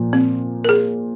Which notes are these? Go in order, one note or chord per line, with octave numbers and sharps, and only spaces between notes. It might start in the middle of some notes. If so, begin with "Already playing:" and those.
Already playing: A#2 F3 A#3
C4
A#4
G#4